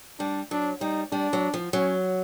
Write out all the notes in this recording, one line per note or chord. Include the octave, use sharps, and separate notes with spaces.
G3 D4
F#3 D4
G3 D#4
G3 D4
F#3
F3
F#3 C#4